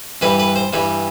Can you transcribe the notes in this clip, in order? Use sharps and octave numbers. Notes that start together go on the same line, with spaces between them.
G2 E3 G3 B4
B4
C5
G2 E3 G3